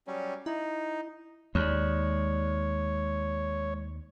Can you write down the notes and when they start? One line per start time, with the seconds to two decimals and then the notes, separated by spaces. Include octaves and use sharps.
0.07 F#3 G3 C#4
0.46 D#4 E4
1.55 D#2 G#3 C#5 D5